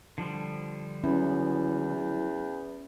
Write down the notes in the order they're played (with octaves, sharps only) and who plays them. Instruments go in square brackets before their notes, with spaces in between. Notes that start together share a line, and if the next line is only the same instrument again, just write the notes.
[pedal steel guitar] D3 F3 G3
[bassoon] E2 [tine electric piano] F#3 E4 [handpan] C#4